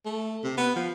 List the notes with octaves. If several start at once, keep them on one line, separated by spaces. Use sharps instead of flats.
A3
C3
B3
F3